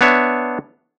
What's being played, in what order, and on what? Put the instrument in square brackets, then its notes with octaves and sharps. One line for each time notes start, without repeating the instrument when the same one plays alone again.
[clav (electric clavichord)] B3 D4 C#5 E5